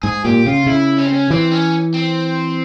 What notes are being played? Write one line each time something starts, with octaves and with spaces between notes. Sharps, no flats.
G#2 G#4
A#2 G4
C#3 F4
C#3 E4
C#4
C4
C#4
E3 C4
C#4
C4